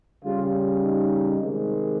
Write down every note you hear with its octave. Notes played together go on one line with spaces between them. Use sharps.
C#3 G3 F4
D#4
C3 D#3 G#3